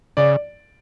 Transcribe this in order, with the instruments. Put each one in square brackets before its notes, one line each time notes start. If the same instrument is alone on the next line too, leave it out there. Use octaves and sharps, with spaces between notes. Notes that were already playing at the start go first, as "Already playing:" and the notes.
[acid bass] C#3 [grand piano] D5